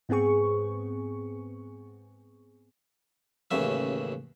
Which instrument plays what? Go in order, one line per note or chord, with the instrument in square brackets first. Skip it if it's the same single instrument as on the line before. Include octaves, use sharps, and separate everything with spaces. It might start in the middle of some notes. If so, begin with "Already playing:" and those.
[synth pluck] G#2 B3 C4 G#4 C#6
[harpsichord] A1 D#2 C#3 E5